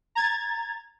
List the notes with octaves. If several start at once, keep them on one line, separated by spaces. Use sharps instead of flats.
A#5 G#6 A6